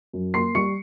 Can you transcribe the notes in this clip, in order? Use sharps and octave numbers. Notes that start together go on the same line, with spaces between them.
F#2
A#3 C6 C7
G3 C#6 C#7